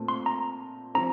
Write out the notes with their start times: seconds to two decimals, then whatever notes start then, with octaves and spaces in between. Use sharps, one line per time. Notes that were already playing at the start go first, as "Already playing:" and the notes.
Already playing: A#2 A3 C4
0.08 C6
0.26 A#5
0.95 F3 C4 A#5